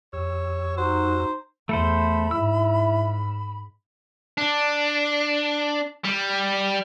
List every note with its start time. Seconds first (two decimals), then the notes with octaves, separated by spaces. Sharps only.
0.13 F2 G4 C#5 E6
0.78 D#4 F#4 C5 A#5
1.69 E2 A3 A4 C5 B5
2.31 G#2 E4 E6
4.38 D4
6.04 G3